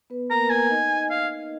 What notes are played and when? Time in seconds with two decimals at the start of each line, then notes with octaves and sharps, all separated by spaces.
0.10 B3 B4
0.30 A#3 A#4 A#5
0.50 G#5
0.70 D#4 D#5
1.10 F5